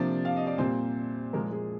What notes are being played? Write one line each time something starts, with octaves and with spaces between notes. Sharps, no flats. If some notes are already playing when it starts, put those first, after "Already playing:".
Already playing: C3 F3 A#3 D4 D5
F5
D#5
D5
A#2 G3 A#3 C4 C5
A#2 F3 G#3 A#3 A#4
G#3 G#4